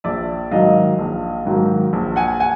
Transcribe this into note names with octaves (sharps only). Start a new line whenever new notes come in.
A#1 D5 E5
G#2 D#3 F#3 D#5 F5
A#1
G#2 D#3 F#3
A#1
F#5 G#5
F#5 G#5